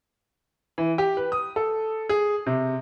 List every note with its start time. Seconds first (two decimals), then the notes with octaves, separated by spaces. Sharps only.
0.78 E3
0.98 G4
1.17 B4
1.32 D#6
1.56 A4
2.09 G#4
2.46 C3